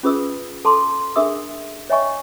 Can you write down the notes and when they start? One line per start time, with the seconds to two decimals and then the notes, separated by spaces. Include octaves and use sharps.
0.03 C#4 F4 G#4 B4 D#6 E6
0.65 A4 A5 C6 D6
1.16 D4 G#4 A#4 E5 D#6 E6
1.90 C#5 D#5 E5 G5 G#5 C#6